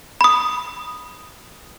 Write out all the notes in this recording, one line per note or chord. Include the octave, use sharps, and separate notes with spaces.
B5 D#6